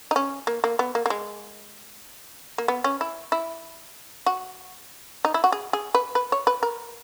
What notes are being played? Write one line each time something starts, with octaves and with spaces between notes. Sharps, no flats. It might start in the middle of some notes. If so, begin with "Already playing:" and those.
D#4
C#4
A#3
A#3
B3
A#3
A#3
G#3
A#3
B3
C#4
E4
E4
F#4
D#4
E4
F#4
G#4
G#4
B4
B4
C#5
B4
A#4